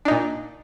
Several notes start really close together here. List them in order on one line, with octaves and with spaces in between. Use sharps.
D4 D#4 A#2